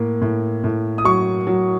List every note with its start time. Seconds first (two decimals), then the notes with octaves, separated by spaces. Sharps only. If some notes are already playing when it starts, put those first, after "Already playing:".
Already playing: A2 A#3
0.21 A2
0.64 A2
0.98 D#6
1.05 F#3 C#6
1.47 F#3